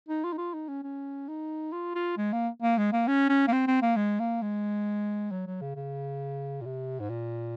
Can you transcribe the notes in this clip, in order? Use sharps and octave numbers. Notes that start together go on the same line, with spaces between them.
D#4
F4
D#4
F4
D#4
C#4
C#4
D#4
F4
F4
G#3
A#3
A#3
G#3
A#3
C#4
C#4
A#3
C4
C4
A#3
G#3
A#3
G#3
F#3
F#3
C#3
C#3
A#2
C3
G#2
A#2